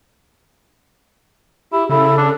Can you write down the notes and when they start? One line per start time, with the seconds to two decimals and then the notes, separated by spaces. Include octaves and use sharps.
1.72 E4 G4
1.89 C#3 E4 A4
2.17 D4